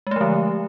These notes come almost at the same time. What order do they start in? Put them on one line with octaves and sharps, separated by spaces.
G#3 A3 F3 D3